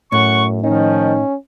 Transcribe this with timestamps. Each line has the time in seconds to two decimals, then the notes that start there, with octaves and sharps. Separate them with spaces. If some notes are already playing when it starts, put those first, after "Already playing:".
0.12 F#2 A2 C#4 F#5 C#6
0.64 D#3 F3 C#4 D#4